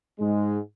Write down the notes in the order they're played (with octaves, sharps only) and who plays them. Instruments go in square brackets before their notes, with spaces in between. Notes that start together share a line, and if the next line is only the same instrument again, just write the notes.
[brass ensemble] G#2 G#3